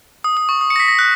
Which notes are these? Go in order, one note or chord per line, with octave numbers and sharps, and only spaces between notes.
D#6
D#6
C#6
D#6
C#7
A#6
B6
A#6
F#6